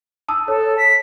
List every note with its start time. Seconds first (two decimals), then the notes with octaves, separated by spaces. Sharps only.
0.28 A5 D#6 E6
0.48 A4 C#5
0.78 B6